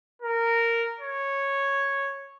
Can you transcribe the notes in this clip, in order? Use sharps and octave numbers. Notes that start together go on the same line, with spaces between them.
A#4
C#5